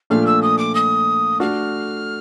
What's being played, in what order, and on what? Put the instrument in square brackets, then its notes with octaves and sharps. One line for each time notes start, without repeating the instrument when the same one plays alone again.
[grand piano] A#2 F3 A3 D4 [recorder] F6
[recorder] E6
D#6
D6
D#6
[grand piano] A3 D4 F#4 A4 [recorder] F6